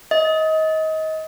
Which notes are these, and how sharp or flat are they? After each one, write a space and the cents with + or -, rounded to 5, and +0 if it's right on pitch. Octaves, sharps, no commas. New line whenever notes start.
D#5 +25